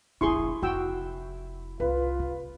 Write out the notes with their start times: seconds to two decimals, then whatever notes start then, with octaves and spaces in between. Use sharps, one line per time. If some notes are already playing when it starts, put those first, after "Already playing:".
0.21 E1 A#1 E4 G#4 C6 C#6
0.62 F1 F#4 G5 E6
1.80 C2 F4 B4
2.19 C3